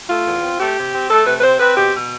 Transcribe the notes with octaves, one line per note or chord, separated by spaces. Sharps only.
A3 F4
E2
C4
A3 G4
C3
C4
A3 A4
C3 B4
B4
C4 C5
C4 B4
B2 G4
B2